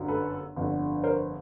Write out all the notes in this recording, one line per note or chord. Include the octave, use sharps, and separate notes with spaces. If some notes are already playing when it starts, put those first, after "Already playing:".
Already playing: G1 F#2 D3 F#3
A4 B4
G1 F2 D3
A#4 C5